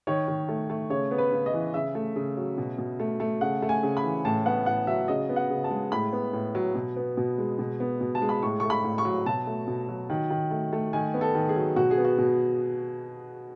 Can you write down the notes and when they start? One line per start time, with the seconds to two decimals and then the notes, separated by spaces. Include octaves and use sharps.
0.07 D#3 C#5
0.28 D#3
0.49 A3
0.70 A3
0.90 C#3 C#5
1.11 B3
1.18 B4
1.32 C#3
1.46 D#5
1.53 E3
1.74 C#3 E5
1.95 A3
2.16 C#3
2.37 F#3
2.58 B2
2.78 B2
3.00 A3
3.20 A3
3.41 C#3 F#5
3.62 A3
3.69 G#5
3.83 C#3
3.97 B5
4.04 E3
4.25 A2 A5
4.46 B3 F#5
4.66 A2 F#5
4.87 F#3 E5
5.08 C#3 D#5
5.29 B3
5.36 F#5
5.50 C#3
5.64 A5
5.71 G#3
5.92 A2 B5
6.13 B3
6.33 A2
6.55 F#3
6.75 B2
6.96 B3
7.17 B2
7.38 G#3
7.59 B2
7.80 B3
8.01 B2
8.15 A5
8.22 G#3
8.29 B5
8.43 A2 C#6
8.60 A3 C#6
8.70 B5
8.84 A2
8.98 C#6
9.05 F#3
9.26 B2 A5
9.47 A3
9.68 B2
9.88 F#3
10.10 D#3
10.30 D#3
10.51 A3
10.73 A3
10.93 D#3 G#5
11.14 B3
11.21 A4
11.35 D#3
11.49 G#4
11.56 F#3
11.76 B2 F#4
11.91 G#4
11.98 B3
12.05 F#4
12.18 B2